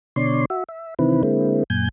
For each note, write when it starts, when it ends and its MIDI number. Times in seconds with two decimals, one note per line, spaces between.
0.16 0.45 47
0.16 0.45 50
0.16 0.45 73
0.16 0.45 74
0.16 0.45 84
0.50 0.64 66
0.50 0.64 76
0.69 0.94 76
0.99 1.22 48
0.99 1.22 51
0.99 1.22 52
0.99 1.22 60
0.99 1.22 64
0.99 1.22 71
1.23 1.64 50
1.23 1.64 56
1.23 1.64 58
1.23 1.64 60
1.23 1.64 64
1.70 1.89 42
1.70 1.89 46
1.70 1.89 80
1.70 1.89 91